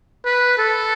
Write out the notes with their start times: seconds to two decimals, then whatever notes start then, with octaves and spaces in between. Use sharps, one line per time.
0.25 B4
0.58 A4